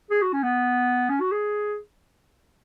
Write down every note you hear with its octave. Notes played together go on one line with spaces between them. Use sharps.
G#4
F#4
C#4
B3
C#4
F#4
G#4